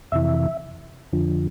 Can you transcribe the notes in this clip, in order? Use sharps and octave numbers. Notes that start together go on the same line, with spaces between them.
F2 C3 E3 E5
F2 D3 F3